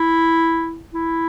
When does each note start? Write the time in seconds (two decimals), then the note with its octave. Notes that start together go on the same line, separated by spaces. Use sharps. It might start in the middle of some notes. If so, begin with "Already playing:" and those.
Already playing: E4
0.93 E4